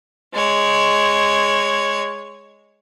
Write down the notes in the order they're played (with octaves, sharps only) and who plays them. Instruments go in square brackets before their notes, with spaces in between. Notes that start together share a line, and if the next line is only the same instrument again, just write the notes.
[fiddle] G#3 C#5